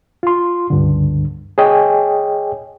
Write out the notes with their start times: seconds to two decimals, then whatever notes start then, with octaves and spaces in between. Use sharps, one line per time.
0.23 F4 C6
0.70 C#2 G2 D3
1.58 G#4 C#5 D#5 G5 G#5